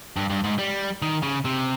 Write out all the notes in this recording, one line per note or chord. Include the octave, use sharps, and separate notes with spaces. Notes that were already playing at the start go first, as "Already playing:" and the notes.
G2
G2
G#2
G3
D#3
C#3
C3